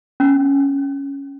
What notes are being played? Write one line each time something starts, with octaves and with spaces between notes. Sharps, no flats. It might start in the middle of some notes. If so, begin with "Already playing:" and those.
C#4